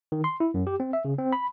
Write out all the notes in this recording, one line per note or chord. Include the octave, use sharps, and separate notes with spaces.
D#3
C6
E4
F#2
G4
C4
E5
C#3
C4
B5